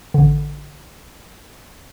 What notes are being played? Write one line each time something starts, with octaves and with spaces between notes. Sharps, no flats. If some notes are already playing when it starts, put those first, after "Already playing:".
A1 D3